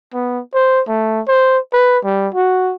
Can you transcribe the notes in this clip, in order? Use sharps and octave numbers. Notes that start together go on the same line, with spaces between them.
B3
C5
A3
C5
B4
G3
F#4